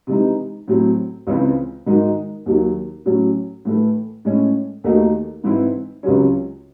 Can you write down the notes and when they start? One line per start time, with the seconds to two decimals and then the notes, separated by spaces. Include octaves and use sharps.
0.07 C3 E3 G#3 D#4
0.68 A2 F#3 C4
1.27 C#2 C#3 E3 C4
1.86 G#2 D#3 G#3 D#4 F#4
2.46 D#2 D#3 F#3
3.05 A2 F#3 C#4
3.65 A2 E3 A3
4.25 A2 G#3 C#4
4.84 D#2 D#3 A3 D#4 F#4
5.44 G#2 E3 C4 E4
6.03 C#2 C3 F#3 C#4